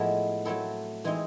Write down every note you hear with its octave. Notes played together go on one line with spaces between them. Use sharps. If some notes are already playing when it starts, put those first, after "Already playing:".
Already playing: A2 F3 G#3 B3 E4
F#3 A3 C4 E4 A4
E3 G#3 C4 D#4